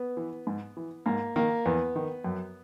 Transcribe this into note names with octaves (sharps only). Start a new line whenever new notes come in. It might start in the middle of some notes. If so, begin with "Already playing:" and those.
Already playing: B3
E3
G#2
E3
G#2 A#3
D#3 A#3
E2 B3
D#3
F#2